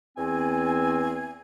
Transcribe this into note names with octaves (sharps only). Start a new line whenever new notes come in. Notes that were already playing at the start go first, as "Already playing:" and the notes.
E2 C4 G#5